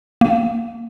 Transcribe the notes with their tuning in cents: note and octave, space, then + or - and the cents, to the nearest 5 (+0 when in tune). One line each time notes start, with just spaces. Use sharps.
A#3 -15